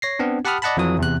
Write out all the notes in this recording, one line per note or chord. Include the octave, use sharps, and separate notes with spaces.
C#5 A#6 C7
B3 C4 D4
G4 F#5 A5 B5 D#6 F6
D5 D#5 F#5 A5 B5
F2 E3 F#3 D#6
E2 C3 F#6